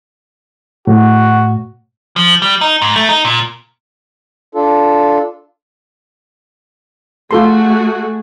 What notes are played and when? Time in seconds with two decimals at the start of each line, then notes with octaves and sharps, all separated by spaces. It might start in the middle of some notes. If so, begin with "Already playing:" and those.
0.87 A2 F#4
2.16 F3
2.42 G3
2.61 D#4
2.82 G#2
2.96 A3
3.09 D#4
3.25 A#2
4.55 D4 F4 A4
7.31 A3 F4 F#4 G#4 A4 C6